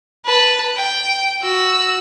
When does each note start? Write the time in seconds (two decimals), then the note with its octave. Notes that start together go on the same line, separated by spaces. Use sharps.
0.25 B4 A5
0.76 G5
1.42 F#4 E6